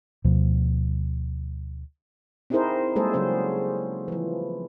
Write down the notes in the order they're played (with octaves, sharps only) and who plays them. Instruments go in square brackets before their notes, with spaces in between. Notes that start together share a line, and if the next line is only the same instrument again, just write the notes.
[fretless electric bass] D2 B2 F3
[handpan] C4 D#4 E4 G#4 A#4 C5
G3 G#3 A#3 G#4 A4 C5
C#3 F#3 C#4 C5
E3 F3